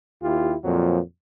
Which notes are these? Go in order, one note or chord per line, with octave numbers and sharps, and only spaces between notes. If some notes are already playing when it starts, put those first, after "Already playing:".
D#2 E4 F4 G4
F2 A#2 F3 F#3